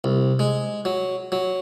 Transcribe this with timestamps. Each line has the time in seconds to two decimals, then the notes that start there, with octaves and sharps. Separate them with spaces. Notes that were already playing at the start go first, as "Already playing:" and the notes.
0.04 C2
0.39 G#3
0.85 F#3
1.32 F#3